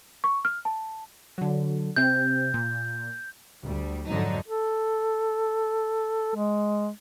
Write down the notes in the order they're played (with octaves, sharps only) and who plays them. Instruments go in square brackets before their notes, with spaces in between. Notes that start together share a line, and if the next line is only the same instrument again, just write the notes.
[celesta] C#6
F6
A5
[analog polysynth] D3 F#3
[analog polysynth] C3 C4 [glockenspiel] G6
[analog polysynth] A#2
[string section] D2 G3
F2 G#2 D3 F#3 D#4
[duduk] A4
G#3